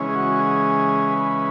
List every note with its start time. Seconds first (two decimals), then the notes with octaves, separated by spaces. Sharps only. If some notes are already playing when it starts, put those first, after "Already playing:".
Already playing: C#3 E3 G#3 C#4
0.09 G#4
0.15 F#4
0.39 G#4
1.10 B4